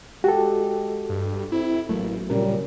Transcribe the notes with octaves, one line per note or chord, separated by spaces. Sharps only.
G#3 F#4 G4 A4
G2
C4 E4
A1 F#3 A3 A#3
A#2 C#3 G3 C#4 A#4